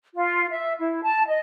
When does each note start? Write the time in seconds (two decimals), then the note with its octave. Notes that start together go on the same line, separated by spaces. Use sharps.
0.15 F4
0.51 E5
0.79 E4
1.02 A5
1.28 D#5